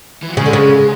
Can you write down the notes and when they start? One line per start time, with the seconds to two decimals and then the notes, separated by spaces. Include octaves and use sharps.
0.23 E3
0.30 F#3
0.37 C#3 G#3
0.46 D3
0.53 C#3